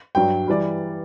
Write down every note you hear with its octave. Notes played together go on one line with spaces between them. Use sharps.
G2 F#3 G5
E3 G3 D5